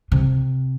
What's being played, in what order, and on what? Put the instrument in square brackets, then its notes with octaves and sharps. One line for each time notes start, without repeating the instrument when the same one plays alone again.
[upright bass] C3